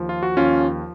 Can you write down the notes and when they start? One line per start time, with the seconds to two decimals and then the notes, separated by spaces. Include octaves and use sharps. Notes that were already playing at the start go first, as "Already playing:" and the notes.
Already playing: D#2 F3
0.09 F4
0.23 F#4
0.37 D#2 C#4 F4